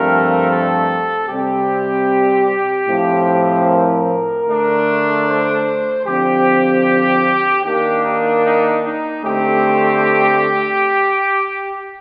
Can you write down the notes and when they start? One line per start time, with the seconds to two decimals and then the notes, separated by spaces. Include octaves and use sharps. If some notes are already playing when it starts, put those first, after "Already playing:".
Already playing: G2 F3 A3 C4 A#4
0.49 A4
1.28 C3 G3 C4 G4
2.87 A2 F3 C4
3.67 A#4
4.47 D3 A3 D4
5.26 C5
6.05 D3 F3 C4 G4
7.64 D#3 A#3 D4 G4
8.04 D#4
8.44 D#4
8.84 D#4
9.24 D3 A3 C4 G4